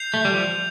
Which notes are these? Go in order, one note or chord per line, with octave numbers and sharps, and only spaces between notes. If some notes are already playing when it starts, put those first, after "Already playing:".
Already playing: G6 C7 F7
A3
G3
F3